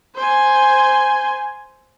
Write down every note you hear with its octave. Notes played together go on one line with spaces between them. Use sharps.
C5 G#5